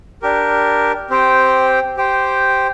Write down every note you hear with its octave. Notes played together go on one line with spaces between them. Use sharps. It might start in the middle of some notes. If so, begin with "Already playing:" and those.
D4 G4 A#4
C4 G4 C5 G5
G4 C5 G5